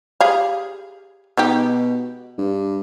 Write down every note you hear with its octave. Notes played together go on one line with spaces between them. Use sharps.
G4 G#4 F5
B2 G#3 D#4 G4
G2